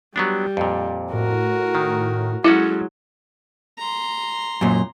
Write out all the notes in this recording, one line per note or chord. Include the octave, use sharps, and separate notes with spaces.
F#3 G3 B3 D4
F2 A#2
A2 F#4 A#4
D#3
F#3 G#3 C#4 E4 F#4 A4
A#5 C6
F#2 A#2